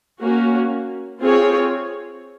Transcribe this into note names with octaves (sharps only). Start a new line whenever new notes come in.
A#3 C#4 F#4
C4 F4 G#4 C#5